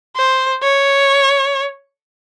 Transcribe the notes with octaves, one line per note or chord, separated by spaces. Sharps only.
C5
C#5